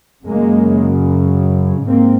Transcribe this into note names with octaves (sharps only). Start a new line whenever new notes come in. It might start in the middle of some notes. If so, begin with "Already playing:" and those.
F#2 C#3 G#3 A#3
G#2 A#3 C4